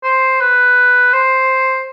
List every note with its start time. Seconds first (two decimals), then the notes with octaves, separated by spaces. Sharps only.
0.04 C5
0.40 B4
1.13 C5